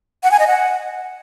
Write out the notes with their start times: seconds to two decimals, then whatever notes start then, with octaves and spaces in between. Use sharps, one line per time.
0.23 F#5
0.31 G#5
0.39 D#5
0.47 F#5